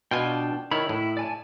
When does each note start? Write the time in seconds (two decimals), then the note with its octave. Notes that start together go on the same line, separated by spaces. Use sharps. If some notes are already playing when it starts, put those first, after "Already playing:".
0.11 B2 D4 F4 G5 G#5
0.72 D#3 E4 C#5 B5
0.89 A2 E4
1.17 D5 G#5 A5